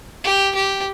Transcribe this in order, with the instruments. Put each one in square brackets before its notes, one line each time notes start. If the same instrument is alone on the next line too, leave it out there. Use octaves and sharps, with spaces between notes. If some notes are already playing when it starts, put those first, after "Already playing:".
[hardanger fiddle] G4
G4